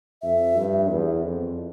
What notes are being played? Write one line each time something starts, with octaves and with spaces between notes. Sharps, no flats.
F2 E5
G2
E2
F2